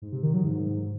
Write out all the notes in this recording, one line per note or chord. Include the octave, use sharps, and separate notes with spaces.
G#2
C3
D#3
F#3
G#2